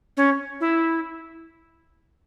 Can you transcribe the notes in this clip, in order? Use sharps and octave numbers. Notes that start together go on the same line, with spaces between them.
C#4
E4